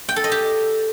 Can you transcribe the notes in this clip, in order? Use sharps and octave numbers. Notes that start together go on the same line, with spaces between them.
G5
A4
D#5
G4